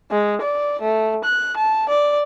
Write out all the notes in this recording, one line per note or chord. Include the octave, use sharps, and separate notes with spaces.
G#3
D5
A3
F#6
A5
D5